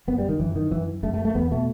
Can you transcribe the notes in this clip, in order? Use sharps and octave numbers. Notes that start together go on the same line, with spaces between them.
F#2 B3
G3
D#3
F#2 E3
D#3
F#2 E3
F#2 A3
A3
A3
E2 B3
B2 A3